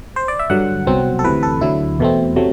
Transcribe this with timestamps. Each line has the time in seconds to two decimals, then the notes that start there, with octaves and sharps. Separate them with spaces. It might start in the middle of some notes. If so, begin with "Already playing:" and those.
0.16 C5
0.28 D5
0.39 E5
0.50 G2 D3 F#3 F#5
0.87 C2 B2 F#3 C4
1.19 A4
1.24 D2 C3 E3 B4
1.43 A4
1.61 D2 D3 F#3 E4
1.99 E2 B2 A3 C4
2.36 C3 F#3 A3